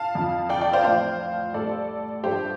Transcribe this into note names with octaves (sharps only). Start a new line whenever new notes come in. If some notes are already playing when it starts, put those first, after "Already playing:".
Already playing: F5 A5
F2 F3
D5 G5
D5 G5
C5 F5
A2 F3 C5 F5
A2 G3 A4 D5
G2 F3 G4 C5